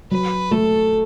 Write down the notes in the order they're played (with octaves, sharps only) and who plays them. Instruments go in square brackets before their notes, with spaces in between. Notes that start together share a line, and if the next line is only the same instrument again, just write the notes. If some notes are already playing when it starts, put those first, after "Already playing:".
[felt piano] F#3 [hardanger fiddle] B4
[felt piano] A3 [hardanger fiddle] A4